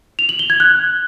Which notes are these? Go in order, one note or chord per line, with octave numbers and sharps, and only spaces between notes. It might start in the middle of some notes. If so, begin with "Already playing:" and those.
F7
F#7
G7
G#6
F#6